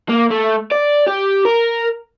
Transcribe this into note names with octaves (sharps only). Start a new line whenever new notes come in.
A#3
A3
D5
G4
A#4